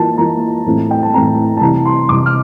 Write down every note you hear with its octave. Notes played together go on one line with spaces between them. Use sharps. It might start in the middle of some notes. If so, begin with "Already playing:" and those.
Already playing: E3 A#3 F4 A5
E3 A#3 F4 A#5
A2 E3 A3 C4
G5
A5
A2 E3 A3 C4 A#5
A5
C3 E3 G3 A#5
C6
C3 E3 G3 D6
F6